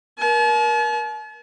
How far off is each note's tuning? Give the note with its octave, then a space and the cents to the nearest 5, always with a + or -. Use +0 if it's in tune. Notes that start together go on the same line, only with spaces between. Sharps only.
A#4 +30 A5 -45